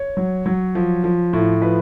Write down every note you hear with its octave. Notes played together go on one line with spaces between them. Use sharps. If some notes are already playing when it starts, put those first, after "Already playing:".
Already playing: C#5
F#3
F#3
F3
F3
A2
F3 B4